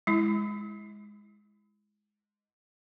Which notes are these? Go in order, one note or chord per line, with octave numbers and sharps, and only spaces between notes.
G#3 E4